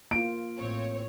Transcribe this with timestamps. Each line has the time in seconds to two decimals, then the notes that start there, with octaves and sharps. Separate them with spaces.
0.11 A#3 F4 D7
0.57 A1 C4 C#5